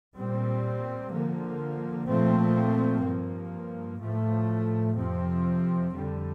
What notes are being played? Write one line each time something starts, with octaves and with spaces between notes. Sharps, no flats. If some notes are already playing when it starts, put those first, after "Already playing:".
A#2 G3 C4
D3 F3 A#3
A#2 F3 A3 C4
G2 F3 A#3
A2 F3 A3
F2 C3 F3 C4
F2 D3 G3